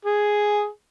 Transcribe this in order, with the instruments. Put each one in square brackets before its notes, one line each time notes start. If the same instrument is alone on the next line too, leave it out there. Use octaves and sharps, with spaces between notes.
[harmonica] G#4